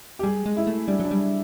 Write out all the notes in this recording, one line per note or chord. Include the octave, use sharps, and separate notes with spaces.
G4
G3 G#4
G#3
E4
A3
G3 D4
F#3 D4
G3